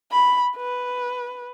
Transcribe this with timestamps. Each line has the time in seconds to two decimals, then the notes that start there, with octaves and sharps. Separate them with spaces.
0.12 B5
0.57 B4